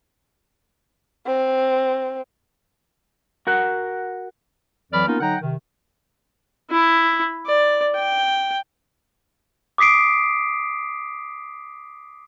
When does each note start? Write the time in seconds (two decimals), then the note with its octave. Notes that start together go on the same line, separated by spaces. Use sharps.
1.26 C4
3.47 F#4 A#4 F#5
4.92 F2 E3 F#3 D5 B5 F6
5.07 A#3 B3 C#4 D#4 F4 A#4
5.20 D3 F#3 D#4 F#5 G5 A#5
5.41 C3 D#3
6.70 E4
7.46 D5
7.95 G5
9.78 D6 D#6 B6 C7 D7